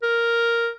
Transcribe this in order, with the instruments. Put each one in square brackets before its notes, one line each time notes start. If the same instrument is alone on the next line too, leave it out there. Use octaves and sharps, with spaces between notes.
[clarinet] A#4